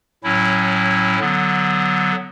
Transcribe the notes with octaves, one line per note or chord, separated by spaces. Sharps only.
A2 F#3 C#4 E4
D3 F#3 B3